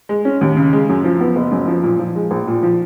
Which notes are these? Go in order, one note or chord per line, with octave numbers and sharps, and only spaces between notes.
G#3
C#4
D#2
C#3
G#3
F#2
F3
B3
F#1
F#2
F3
A#2
F3
G#3
A#1
A#2
F3